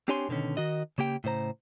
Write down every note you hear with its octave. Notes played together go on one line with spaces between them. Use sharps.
C4 D4 G4 C#5 G#5 C6
B2 D3 D#3 C#4
D#3 F#4 D#5
C#3 A#3 G4 G5
A2 C#3 C5 A#5